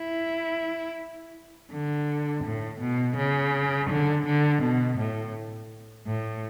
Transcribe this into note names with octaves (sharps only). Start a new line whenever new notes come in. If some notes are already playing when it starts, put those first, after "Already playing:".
Already playing: E4
D3
A2
B2
C#3
D3
D3
B2
A2
A2